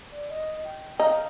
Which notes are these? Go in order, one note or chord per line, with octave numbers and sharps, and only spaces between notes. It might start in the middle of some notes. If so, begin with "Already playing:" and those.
D5
D#5
G5
D#4 F5